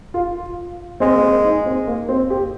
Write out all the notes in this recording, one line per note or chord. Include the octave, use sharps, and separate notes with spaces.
F4
G#3 C4
A#3
C4
D#4
C4
A#3
C4
G4